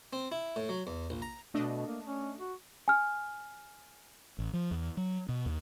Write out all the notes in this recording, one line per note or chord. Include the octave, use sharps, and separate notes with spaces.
C4
E4
A2
F#3
E2
A#1
A#5
B2 A3 D4 D#5
A#3
C#4
F#4
G#5 F6
A1
F3
E2
F#3
B2
D#2